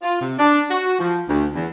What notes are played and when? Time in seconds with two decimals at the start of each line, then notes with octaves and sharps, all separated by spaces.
0.03 F4
0.20 C3
0.39 D4
0.71 F#4
0.99 F3
1.28 D2
1.54 E2